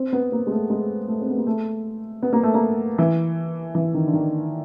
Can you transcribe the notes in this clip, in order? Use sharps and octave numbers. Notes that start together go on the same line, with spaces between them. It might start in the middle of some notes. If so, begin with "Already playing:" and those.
Already playing: C4
B3
A#3
G#3
A3
G#3
A3
C4
B3
A#3
A3
B3
A#3
A3
A#3
E3
E3
D#3
D3
D#3